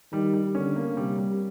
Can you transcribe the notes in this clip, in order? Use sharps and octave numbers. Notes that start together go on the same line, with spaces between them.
D#3 G3
G3
D3 C#4
A#3
C3 G3
G3